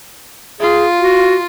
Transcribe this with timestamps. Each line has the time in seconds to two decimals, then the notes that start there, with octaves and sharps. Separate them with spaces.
0.61 F4 G#4
1.00 F#4